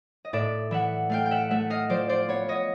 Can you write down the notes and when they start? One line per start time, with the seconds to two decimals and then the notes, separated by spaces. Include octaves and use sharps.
0.25 D#5
0.33 A2 D5 E5
0.71 E3 E5 F#5
1.10 A3 F5 G5
1.26 G5
1.31 E5 F#5
1.51 A3 E5 F#5
1.70 D#5 F5
1.89 F3 C5 D5
2.09 C5 D5
2.29 B3 C#5
2.48 C#5 D#5